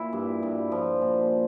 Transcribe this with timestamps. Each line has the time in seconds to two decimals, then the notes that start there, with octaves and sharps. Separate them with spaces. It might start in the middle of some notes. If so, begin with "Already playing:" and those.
Already playing: A#2 E4
0.13 G2
0.43 G2
0.72 F3
1.01 A#2